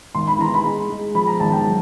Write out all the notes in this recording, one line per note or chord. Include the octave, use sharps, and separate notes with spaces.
G#1 C6
B5
E3 A#5
B5
G#3
G#3
F3 B5
A#5
G#1 A5
G5
F#3